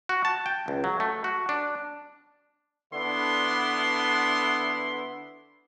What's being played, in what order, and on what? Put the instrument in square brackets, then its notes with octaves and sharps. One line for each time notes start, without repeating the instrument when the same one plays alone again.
[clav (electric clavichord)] F#4
A5
G5
C#2
F#3
A3
F#4
D4
[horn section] D3 B3 D4 E4 C6